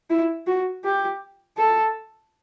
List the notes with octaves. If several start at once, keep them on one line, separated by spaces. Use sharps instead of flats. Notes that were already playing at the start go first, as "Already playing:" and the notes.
E4
F#4
G4
A4